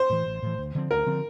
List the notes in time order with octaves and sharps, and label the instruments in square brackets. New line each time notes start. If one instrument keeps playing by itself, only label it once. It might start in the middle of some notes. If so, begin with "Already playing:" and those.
Already playing: [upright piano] C5
[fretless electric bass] A2 E3
A1
A2 E3
D2
D3 F3 C4
[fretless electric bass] D2 [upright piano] A#4
[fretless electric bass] D3 F3 C4